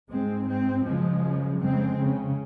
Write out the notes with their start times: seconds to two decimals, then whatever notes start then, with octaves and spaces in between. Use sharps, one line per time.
0.10 G#2 G#3 C4
0.47 G#3 C4
0.85 F#2 C#3 F3 G#3
1.61 F2 C#3 G#3 C4
1.98 C#3